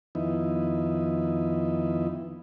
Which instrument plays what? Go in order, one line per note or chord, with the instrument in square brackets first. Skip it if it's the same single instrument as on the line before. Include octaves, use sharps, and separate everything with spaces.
[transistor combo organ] F2 D#3 B3 D#4 E4